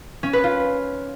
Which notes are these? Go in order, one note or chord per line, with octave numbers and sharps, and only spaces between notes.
C#4
B4
F4